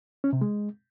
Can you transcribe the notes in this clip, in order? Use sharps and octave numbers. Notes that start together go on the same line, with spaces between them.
C#4
C3
G#3